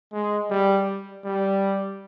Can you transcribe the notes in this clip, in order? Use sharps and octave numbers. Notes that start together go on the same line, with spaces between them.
G#3
G3
G3